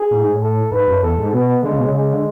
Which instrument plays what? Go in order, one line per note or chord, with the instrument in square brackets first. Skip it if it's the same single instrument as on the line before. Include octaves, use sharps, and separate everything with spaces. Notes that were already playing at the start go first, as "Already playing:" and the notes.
Already playing: [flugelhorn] G#4
[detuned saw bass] A2
G#2
A2
[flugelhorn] A4
[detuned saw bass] G#2 [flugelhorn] B4
[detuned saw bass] F#2
[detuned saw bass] E2 [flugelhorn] A4
[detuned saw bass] G#2
[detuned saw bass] B2 [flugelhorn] B3
[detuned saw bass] D3 [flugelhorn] G#3
[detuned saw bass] C#3
B2
C#3
[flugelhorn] G#3
[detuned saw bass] D3